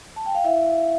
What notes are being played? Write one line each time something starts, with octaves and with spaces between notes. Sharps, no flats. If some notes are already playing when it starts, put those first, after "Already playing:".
A5
G5
F5
E4 E5